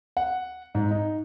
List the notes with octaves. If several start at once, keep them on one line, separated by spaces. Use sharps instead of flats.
F#5
G#2
D#4